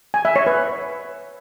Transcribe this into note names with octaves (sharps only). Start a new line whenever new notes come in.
G#5
E5
C#5
B4